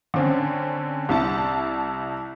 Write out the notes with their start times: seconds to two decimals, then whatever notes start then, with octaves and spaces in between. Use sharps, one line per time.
0.14 D3 C4 C#4
1.09 C2 E4 A5